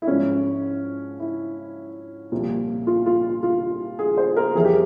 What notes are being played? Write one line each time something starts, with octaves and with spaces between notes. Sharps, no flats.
E4
G#2 F3 C#4
E4
C2 A#2 F3
F4
F4
F4
G#4
C5
A#4
F2 E3 G3 G#4
G4